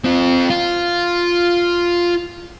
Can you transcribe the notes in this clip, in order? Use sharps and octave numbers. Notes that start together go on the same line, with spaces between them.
C4 F4
F4